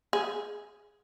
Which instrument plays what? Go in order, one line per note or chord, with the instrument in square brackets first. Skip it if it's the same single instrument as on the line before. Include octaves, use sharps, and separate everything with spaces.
[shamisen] G#4